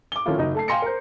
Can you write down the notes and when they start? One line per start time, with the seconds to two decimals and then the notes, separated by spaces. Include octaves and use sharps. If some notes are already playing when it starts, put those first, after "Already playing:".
0.12 D6 G7
0.26 D#3 F3 A3 C#4 E4 F4
0.38 F#1 F#3 D#4 D#5
0.55 A3 A5 C7
0.68 F5 G5 G#5 C6 A#6 C#7
0.82 A#4 C5